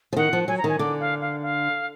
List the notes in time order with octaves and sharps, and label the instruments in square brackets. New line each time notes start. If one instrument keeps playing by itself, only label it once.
[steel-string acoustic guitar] F3
[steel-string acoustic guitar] D#3 [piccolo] F#5
[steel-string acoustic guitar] F3
[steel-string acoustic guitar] F#3 [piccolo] G#5
[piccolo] A#5
[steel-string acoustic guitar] D#3 [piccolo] G#5
[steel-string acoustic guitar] D3 [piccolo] D6
[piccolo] F5
F5
F5